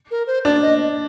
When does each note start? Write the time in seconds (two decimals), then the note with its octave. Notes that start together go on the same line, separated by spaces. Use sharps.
0.11 A#4
0.27 C5
0.45 D4 D5
0.62 D#5